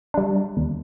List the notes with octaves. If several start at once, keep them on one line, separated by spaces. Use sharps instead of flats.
G3 D4
D#2